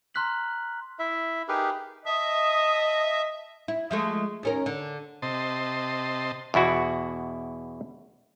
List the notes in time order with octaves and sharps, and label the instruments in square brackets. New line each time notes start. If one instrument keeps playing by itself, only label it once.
[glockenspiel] A#5 C6 F6 F#6 B6 F#7
[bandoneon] E4 E5
D#4 G4 G#4 A#4 B4
[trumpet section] D#5 [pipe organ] E5 [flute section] A5 D#6
[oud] E4
F3 G#3 A3
D#2 C#4 A#4
D3
[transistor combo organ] C3 D#5 A5 C6
[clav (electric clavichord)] E2 B2 E4 F#4